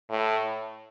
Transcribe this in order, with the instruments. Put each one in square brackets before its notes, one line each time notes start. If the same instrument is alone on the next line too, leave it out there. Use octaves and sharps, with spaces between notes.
[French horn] A2